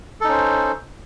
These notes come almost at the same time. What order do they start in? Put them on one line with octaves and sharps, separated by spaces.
A4 D#4 C#4 C5